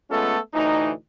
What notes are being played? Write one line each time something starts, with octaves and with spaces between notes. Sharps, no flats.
G#3 A3 B3 C#4 F4 A4
D2 A2 E3 D#4